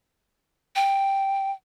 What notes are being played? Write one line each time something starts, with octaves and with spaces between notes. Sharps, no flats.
G5